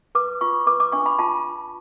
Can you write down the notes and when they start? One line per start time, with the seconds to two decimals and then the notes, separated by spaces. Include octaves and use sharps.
0.15 B4 D6
0.41 F4 C#6
0.67 B4 D6
0.80 D6
0.92 D4 C#6
1.06 B5
1.19 F4 A5